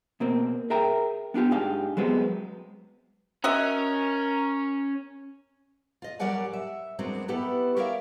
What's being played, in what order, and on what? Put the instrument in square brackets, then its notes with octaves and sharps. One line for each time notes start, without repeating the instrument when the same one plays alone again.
[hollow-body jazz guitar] B2 A#3 C4
G#4 A#4 E5 G5 A#5
B3 D4 F4 G4
G#2 G#3 D4 G4 F5 G5
F#3 G#3 B3 C4
[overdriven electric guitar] C#4 [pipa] F#4 D#5 E5 [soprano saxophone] A#4
[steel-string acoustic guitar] F4 D#5
F#3 G3 A#4 D5 F#5 G#5
E5
G2 F#3 G#3 C4 D4 A#4
B3 E4 G4 A4 B4
G4 A#4 C#5 D5 E5 F5